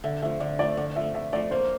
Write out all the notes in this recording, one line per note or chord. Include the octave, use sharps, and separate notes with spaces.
D3 E5
F3 A3 E5
D3 D5
F3 A3 D5
D3 D5
F3 A3 E5
D3 E5
F3 A3 D5
A#3 C5